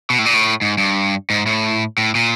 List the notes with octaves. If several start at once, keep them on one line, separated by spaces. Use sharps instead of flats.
B2
A2
A#2
A2
G#2
G2
G#2
A2
A2
A#2